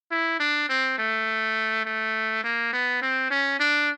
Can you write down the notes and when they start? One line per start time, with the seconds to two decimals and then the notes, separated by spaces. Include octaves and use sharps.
0.11 E4
0.40 D4
0.69 C4
0.98 A3
1.86 A3
2.44 A#3
2.73 B3
3.02 C4
3.31 C#4
3.60 D4